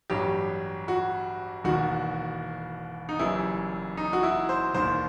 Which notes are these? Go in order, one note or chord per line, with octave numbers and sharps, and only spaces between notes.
A1 G2 F#3 G4
F#4
E1 D#2 D#3 F#4
D#4
F#1 F#2 E3 G3 E4
D#4
F#4
E4
C5
E1 D#2 D#3 C5